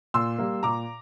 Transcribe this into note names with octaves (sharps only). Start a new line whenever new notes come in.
A#2 C6 E6
G3 A#3
A#2 A#5 D6